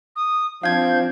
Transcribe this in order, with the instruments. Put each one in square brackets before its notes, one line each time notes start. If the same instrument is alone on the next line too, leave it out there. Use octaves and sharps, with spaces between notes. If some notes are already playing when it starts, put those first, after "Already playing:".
[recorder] D#6
[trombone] F3 [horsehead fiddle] C4 D4 [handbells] F5 G#6 [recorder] G6